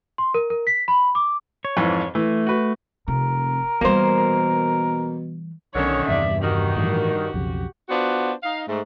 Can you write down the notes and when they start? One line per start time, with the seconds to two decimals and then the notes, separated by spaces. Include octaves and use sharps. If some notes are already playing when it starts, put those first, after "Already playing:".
0.18 C6
0.34 A#4
0.50 A#4
0.67 B6
0.88 B5
1.15 D6
1.65 C#5
1.77 F2 G#2 E3
2.15 E3 A3
2.46 F#4 B4
3.08 F1 C3 A#4
3.81 B2 E3 G3 A#3 C5
5.75 B1 D3 D#3 C#4 C#5
6.08 E2 G2 C3 D5 E5
6.42 D#3 F#4 G4
6.76 A2 E3 F3
7.34 B1 F2 C#3
7.89 B3 D4 F4 F#4 C5
8.43 D#4 F5
8.68 G#2 A3